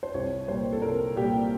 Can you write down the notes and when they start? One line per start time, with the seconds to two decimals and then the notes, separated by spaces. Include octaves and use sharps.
0.03 C5
0.14 C2 C#5
0.48 A#2 G3 A#3 C5
0.73 A4
0.82 C2 A#4
1.16 A#2 G3 A#3 G4